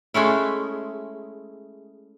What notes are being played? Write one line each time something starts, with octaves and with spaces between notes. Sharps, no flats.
G#3 A3 C#4 E4